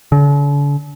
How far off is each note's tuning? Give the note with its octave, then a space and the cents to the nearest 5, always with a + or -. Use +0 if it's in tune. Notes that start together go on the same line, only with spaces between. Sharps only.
D3 -45